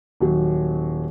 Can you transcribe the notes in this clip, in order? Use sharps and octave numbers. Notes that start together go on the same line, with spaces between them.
D#1 F#3